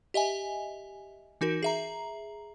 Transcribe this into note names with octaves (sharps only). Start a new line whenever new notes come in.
G4 D#5 E5 G#5
E3 D#4 F#4 A#4
G#4 E5 A#5